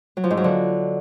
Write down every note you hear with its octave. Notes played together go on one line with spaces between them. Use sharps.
F#3
F3
G#2
F#3
D3